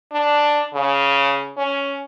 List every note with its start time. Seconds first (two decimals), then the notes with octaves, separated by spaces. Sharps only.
0.12 D4
0.74 C#3
1.57 C#4